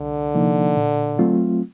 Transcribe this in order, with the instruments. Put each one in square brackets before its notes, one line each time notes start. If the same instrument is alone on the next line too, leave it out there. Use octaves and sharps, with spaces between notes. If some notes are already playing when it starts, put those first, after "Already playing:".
Already playing: [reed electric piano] C2 [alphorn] D3
[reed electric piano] C3 F3 A#3 D#4
A#2
F#3 A3 C4 F4